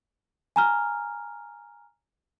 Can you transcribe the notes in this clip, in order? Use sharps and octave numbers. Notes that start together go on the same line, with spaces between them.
G#5 A#5 F6